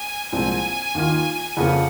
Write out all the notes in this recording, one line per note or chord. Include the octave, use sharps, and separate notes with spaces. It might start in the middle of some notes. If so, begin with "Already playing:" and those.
Already playing: G#5
C2 A#2 F3 G#3 C4 G#5
D#2 D#3 A#3 F4
F2 C#3 F3 A#3 F#5